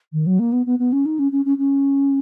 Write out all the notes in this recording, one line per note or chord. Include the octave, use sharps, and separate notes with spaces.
D#3
F#3
A#3
B3
B3
B3
C#4
D#4
C#4
C#4
C#4
C#4